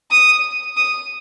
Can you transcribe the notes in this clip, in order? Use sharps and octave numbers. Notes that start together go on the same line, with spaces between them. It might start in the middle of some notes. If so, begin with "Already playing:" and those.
D#6
D#6